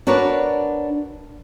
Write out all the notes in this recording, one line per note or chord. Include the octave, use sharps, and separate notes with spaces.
D4 F#4 A#4 B4 C#5 D5